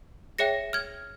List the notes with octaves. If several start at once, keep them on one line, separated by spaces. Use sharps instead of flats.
G#4 C#5 E5 G5 A#6 C#7
F6 G#6